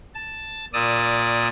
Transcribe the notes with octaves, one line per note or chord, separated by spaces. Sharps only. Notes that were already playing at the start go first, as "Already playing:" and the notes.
A5
A#2 D5 D#6 E6